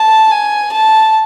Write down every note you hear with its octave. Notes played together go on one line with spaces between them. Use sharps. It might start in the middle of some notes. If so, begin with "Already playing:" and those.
Already playing: A5
G#5
A5